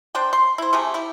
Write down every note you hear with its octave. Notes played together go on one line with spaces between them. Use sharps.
D4 C5 D5 G5
C6
E4 C5
C3 A3 G4 G#4
E4 G4